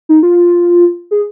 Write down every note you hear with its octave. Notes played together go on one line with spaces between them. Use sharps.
D#4
F4
G#4